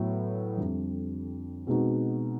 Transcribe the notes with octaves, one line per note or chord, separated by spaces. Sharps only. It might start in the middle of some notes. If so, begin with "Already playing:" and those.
Already playing: A2 F#3 B3
F2 D3 G3
B2 G#3 C4 D#4 F#4